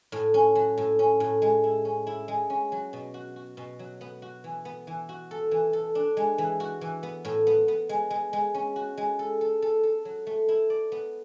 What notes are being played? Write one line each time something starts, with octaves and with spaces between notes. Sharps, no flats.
A2
C#4
F#3
A2
C#4
A2
G#3
E4
C#4
E4
G#3
C#4
F#3
B2
F#4
F#4
B2
F#3
B3
F#4
E3
B3
E3
F#4
A4
E3
A4
D4
G#3
E3
F#4
E3
B3
A2
B3
B3
G#3
G#3
G#3
C#4
F#4
G#3
A4
A4
A4
A4
F#3
A3
E4
D5
B3